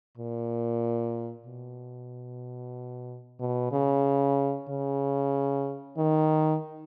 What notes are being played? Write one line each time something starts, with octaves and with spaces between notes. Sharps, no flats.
A#2
B2
B2
C#3
C#3
D#3